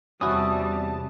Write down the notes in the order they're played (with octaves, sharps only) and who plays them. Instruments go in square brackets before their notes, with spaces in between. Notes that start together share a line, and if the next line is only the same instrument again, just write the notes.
[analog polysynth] E2 C3 A5 [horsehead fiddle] G3 [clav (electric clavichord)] C#4 E4 F#4 [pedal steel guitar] D#6